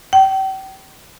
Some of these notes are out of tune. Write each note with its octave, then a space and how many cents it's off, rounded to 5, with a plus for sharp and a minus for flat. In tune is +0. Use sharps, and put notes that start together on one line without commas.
G5 -35